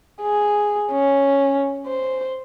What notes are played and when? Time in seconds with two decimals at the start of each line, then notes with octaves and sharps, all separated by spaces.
0.22 G#4
0.91 C#4
1.87 C5